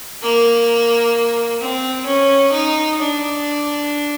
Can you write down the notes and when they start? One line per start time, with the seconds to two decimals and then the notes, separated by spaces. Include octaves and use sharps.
0.23 A#3
1.62 C4
2.07 C#4
2.52 D#4
2.99 D4